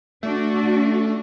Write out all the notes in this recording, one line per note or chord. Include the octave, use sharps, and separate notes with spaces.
A3 D4 F#4